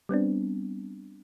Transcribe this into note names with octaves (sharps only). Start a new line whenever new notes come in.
G3 B3 C4 D4